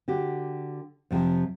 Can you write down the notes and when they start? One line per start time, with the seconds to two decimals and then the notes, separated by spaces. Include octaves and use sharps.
0.08 D3 F#4 G4
1.11 F2 C3 D#3 F3